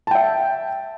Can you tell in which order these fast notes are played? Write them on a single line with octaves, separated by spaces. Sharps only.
A5 G5 E5